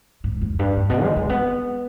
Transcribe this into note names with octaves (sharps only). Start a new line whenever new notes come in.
G#2
F2
G2
G2
B2
G#3
G#3
B3